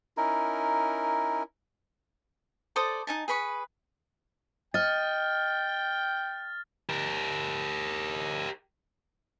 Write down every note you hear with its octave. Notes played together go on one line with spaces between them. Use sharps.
C#4 D#4 E4 A#4
A4 C5 D5 D#6
D#4 G#5 A5
G#4 B4 B5 C#6
D#5 G5 F6 A6
G4 A#4